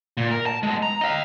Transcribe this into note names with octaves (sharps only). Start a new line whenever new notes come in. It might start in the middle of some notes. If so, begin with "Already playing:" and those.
A#2
A#4
A5
G#3 B3
A#5
D#5 F5